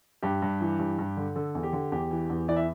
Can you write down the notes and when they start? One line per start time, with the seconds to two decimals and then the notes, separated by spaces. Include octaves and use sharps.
0.23 G2 G4
0.42 G2
0.61 E3
0.79 G2
0.99 G2
1.17 D3
1.36 D3 A4
1.55 E2
1.63 G4
1.73 D3
1.92 E2 G4
2.11 E3
2.30 E2
2.48 E3 D5
2.56 E5